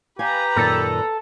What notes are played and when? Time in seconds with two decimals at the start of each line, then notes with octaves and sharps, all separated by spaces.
0.19 G4 B4 F5 G#5 A#5
0.56 F#2 A#2 D#3 A4